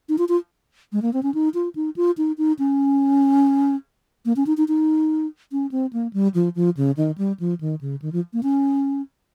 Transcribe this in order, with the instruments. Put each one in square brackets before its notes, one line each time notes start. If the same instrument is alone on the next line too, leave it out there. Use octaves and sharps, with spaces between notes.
[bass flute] D#4
F4
F4
G#3
A#3
C4
C#4
D#4
F4
D#4
F4
D#4
D#4
C#4
A#3
C#4
D#4
D#4
D#4
C#4
C4
A#3
G3
F3
F3
C#3
D#3
G3
F3
D#3
C#3
D#3
F3
A#3
C#4